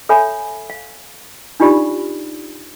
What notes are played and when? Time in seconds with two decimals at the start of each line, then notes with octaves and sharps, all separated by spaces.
0.09 A4 C#5 E5 G#5 B5
0.70 F5
1.60 D4 D#4 F4 G4 D5 B5